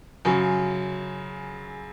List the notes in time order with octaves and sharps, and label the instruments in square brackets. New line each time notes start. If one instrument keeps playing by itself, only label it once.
[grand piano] F#2 C#3 F#3